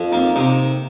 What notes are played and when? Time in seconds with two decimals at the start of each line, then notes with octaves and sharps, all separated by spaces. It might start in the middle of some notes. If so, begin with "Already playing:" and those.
Already playing: F2
0.12 A#3 C4 D#4
0.35 C3 C4 D#4